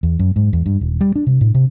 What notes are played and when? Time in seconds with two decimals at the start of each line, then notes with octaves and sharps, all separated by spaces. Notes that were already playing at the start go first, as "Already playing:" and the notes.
0.03 E2
0.19 F#2
0.36 G#2
0.53 E2
0.66 G2
0.81 D#1
1.01 G3
1.16 D4
1.27 C3
1.41 A2
1.55 C3